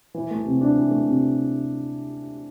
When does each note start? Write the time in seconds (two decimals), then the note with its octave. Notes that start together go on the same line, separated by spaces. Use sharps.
0.14 E3
0.31 A3
0.46 C3
0.61 D4
0.76 E3
0.91 A3
1.07 C3